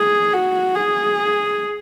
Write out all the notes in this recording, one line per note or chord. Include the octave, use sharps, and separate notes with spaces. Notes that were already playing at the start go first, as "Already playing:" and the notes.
Already playing: G#4
F#4
G#4